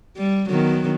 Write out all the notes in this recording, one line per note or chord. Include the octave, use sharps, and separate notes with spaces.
G3
D#3 F#3 B3